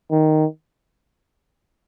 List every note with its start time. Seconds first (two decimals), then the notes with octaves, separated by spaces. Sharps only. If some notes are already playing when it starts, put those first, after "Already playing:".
0.11 D#3